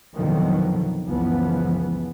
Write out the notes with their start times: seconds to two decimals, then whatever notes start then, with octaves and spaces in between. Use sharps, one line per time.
0.15 F2 B2 D3 D#3 F3 F#3
1.06 F#1 C#2 E3 F3 B3